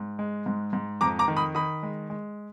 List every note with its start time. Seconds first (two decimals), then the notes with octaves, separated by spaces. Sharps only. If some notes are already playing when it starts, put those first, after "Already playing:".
Already playing: G#2
0.19 G#3
0.46 G#2
0.73 G#2
1.01 F2 A#5 D6
1.19 A#5 D6
1.28 D#3
1.37 B5 D#6
1.55 D#3 B5 D#6
1.83 G#3
2.10 G#3